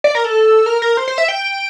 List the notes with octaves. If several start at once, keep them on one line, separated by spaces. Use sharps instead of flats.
D5
A#4
A4
A#4
A#4
C5
C5
E5
G5